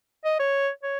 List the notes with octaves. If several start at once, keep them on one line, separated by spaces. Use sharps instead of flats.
D#5
C#5
C#5